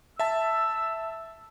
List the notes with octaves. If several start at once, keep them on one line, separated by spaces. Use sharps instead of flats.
E5 A5 E6